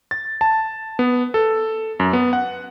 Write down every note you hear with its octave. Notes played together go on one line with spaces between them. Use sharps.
A6
A5
B3
A4
F#2
B3
F#5